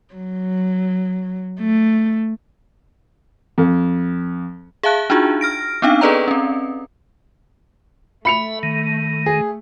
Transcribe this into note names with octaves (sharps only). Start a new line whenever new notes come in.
F#3
A3
F2
G#4 E5 F5 A5 F#6
D4 D#4 F4 F#4 G#4
F6 A#6 D7
B3 C4 D4 D#4 F5 G5
G#4 A4 B4 D5 D#5 A#5
C4 C#4
A3 E5 B5 C#7 F7
D#3
G#4